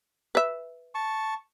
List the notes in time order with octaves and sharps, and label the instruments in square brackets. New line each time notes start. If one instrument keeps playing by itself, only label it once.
[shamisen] B4 E5
[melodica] A5 C#6